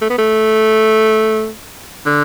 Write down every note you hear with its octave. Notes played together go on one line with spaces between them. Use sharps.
A3
B3
A3
D3